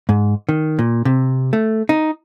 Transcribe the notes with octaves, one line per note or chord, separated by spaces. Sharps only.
G#2
D#3
A#2
C3
A3
D#4